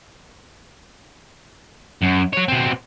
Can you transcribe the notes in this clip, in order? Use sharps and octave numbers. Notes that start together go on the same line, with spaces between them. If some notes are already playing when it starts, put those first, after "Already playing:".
F#2
F#4 C#5
B2 C4